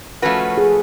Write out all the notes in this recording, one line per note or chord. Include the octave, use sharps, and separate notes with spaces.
F3 A3 C#4 F#4 B4
G#4